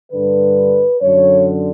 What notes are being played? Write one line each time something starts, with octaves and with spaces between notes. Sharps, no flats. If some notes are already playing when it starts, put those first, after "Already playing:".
G2 D3 B4
F#2 D3 C#5